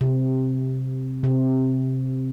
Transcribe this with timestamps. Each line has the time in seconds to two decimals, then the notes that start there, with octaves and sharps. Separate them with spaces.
0.01 C3
1.24 C3